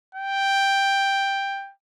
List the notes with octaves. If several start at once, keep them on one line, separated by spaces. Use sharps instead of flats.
G5